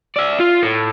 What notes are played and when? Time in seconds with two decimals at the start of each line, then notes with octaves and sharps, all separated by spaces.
0.16 D5 E5
0.40 F4
0.63 A2